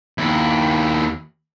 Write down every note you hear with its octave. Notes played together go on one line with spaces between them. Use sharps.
D#2 E4